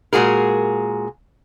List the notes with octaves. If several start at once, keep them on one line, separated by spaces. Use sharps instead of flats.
A#2 G#3 F#4 G#4 A#4